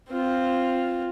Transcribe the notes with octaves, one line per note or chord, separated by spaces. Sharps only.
C4 F4